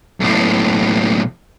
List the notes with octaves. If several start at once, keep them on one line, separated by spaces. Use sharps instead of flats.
B1 A2